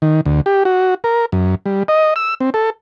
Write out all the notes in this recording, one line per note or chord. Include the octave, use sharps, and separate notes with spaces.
D#3
D2
G4
F#4
A#4
F#2
G3
D#5
E6
C4
A4